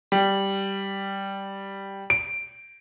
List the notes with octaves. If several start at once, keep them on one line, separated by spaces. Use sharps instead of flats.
G3
D7